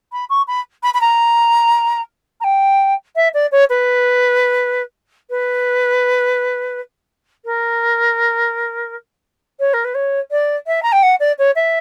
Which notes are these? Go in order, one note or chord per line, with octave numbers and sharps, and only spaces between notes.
B5
C#6
B5
B5
B5
A#5
A#5
G5
E5
D5
C#5
B4
B4
A#4
C#5
A#4
B4
C#5
D5
E5
A#5
G5
F#5
D5
C#5
E5